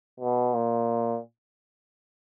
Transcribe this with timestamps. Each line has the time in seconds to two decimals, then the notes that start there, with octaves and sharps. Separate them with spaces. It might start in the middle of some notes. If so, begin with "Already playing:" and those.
0.20 B2
0.54 A#2